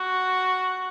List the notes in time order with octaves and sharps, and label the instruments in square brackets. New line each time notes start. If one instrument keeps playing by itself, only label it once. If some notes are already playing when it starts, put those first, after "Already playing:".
Already playing: [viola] F#4